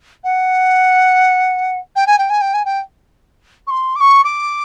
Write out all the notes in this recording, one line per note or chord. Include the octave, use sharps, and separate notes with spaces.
F#5
G5
G#5
G5
G#5
G5
G#5
G5
C#6
C6
D6
C#6
D6